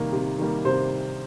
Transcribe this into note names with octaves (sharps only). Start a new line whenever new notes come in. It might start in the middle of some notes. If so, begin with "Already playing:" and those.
Already playing: C3 D#3 G3 A#3
C3
D#3 G3 A#3
C3 C5